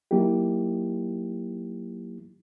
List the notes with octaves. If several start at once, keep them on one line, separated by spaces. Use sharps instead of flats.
F#3 A#3 D#4 E4 G4